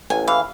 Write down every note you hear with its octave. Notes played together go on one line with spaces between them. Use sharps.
A1 G#5
E3 F5